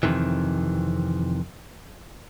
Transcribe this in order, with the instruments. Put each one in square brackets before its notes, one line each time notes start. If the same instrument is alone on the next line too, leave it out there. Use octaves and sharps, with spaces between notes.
[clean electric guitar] F2 G#2 C3 D#3 E3